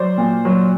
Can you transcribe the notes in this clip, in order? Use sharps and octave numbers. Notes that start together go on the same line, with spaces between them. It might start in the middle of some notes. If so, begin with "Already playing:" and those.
Already playing: F#3 C5 D5
A#2
F#3